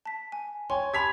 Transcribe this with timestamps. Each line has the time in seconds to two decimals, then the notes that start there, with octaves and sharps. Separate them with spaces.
0.05 A5 B6
0.32 G#5
0.70 C#5 G5 G#5 C6
0.94 G4 A5 B5 G#6 B6 F7